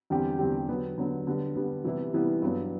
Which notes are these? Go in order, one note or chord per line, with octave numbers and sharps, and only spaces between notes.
E2 D3 G3 C4 G4
E2 D3 G3 C4 G4
D3 F#3 B3
D3 F#3 B3
D3 G3 B3
D3 G3 B3
C3 E3 G3 B3 E4
C3 E3 G3 B3 E4
G2 F#3 B3